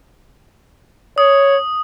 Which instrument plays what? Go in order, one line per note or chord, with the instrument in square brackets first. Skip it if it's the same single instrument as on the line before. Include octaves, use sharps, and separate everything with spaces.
[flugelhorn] C#5 [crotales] D#6